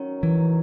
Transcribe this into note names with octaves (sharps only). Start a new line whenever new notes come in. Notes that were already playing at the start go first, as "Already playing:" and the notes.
Already playing: D#3 F#3 C#4
E3